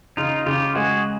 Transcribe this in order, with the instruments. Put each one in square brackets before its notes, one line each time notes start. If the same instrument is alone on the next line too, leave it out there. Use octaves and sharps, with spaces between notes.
[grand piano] C#3 [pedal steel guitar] D#4 F4
[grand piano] C#3 [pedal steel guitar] F4 G4
[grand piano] G#3 [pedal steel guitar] F#4 G#4